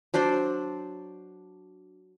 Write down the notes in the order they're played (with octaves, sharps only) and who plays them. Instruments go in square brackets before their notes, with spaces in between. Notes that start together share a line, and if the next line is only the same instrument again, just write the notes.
[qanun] F#3 D4 C5 D5